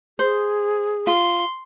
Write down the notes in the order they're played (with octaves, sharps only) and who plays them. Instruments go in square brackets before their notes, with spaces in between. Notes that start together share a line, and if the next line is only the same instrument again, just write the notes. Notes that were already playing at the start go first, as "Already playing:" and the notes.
[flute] G#4 [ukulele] C5
[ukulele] F4 [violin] C6